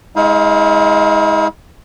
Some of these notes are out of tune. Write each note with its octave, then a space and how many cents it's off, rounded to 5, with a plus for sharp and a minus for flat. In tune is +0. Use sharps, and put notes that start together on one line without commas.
G#3 +0 E4 -45 F5 +0